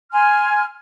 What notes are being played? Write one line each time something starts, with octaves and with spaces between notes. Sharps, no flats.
G#5 C6 F6